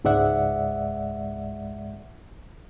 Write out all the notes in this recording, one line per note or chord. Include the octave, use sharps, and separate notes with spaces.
C#2 G#2 G#3 D5 E5 F#5